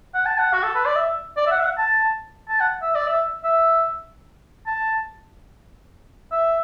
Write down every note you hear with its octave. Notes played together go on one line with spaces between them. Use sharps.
F#5
A5
F#5
F#4
A4
B4
D5
E5
D5
E5
F#5
E5
F#5
A5
A5
F#5
E5
D5
E5
E5
A5
E5